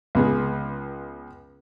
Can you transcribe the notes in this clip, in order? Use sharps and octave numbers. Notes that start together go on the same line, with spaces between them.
C#2 B3 G#4